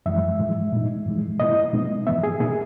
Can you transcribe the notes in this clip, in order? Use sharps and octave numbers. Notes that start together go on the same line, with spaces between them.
F#2 E3 G#3 E5
G#2 E3 G#3
A#2 G#3 D#4
G#2 E3 G#3
B2 A#3 E4 D#5
B2 G#3 B3 D#4
G#2 E3 B3 E5
G#4
B2 A#3 D#4 G#4